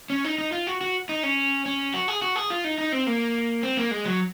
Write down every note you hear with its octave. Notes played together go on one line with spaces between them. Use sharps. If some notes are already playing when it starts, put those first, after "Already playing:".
C#4
D#4
D#4
F4
F#4
F#4
D#4
C#4
C#4
F#4
G#4
F#4
G#4
F4
D#4
D#4
C4
A#3
C4
A#3
G#3
F#3